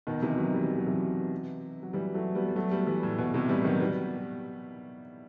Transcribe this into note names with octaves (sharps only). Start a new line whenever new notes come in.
B2 D#3
C3 E3
D#3 F#3
E3 G3
E3
F#3
C3 E3
F#3
E3 G3
F#3 A3
G3 B3
G3
F#3 A3
G3 B3
E3 G3
A2
B2
A2 C3
E3 G3
D#3 F#3
G3 B3